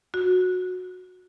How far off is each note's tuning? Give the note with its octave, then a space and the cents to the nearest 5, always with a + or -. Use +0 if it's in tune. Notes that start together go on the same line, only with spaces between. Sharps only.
F#4 -15